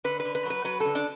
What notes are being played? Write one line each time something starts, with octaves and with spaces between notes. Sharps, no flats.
D3 B4
B4
D3
B4
F#3 B4
F#3 B4
D3 A4
D4